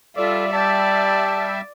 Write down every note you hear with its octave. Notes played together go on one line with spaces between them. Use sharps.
G3 F4 A4 D5 E5
D5 G5 A5